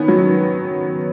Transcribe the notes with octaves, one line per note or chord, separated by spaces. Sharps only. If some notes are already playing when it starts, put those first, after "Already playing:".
Already playing: D#3 B3 C#4
F#3